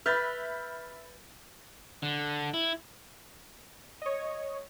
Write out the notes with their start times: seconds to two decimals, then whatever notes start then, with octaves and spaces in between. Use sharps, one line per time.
0.06 B4 E5 B5 F6 G6 A6
2.03 D3
2.54 E4
4.02 C#5 D#5